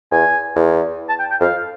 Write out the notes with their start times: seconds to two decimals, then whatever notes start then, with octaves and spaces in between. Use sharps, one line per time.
0.12 E2 G#5
0.56 E2
1.09 A5
1.19 G5
1.31 G5
1.41 F2 F5